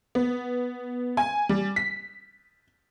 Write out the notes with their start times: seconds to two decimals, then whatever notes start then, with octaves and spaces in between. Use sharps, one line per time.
0.15 B3
1.17 G#5
1.49 G3
1.76 B6